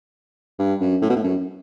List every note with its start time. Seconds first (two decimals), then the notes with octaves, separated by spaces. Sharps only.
0.59 G2
0.80 F#2
1.02 A2
1.10 B2
1.16 A2
1.23 F#2